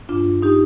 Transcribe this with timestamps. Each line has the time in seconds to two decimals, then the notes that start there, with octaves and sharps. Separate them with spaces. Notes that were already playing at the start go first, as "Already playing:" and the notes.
0.09 G2 D4 F4
0.26 G2
0.42 D#4 G4